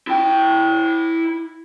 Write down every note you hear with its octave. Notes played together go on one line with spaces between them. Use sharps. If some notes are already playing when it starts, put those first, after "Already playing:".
E4 G5